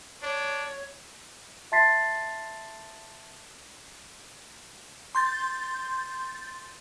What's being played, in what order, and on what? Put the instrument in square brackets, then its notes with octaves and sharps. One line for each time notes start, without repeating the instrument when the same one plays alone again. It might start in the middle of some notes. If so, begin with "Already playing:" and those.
[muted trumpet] D4 [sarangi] C#5
[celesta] E5 A5 C6 A6 B6 C7
[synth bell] C6 G6 A6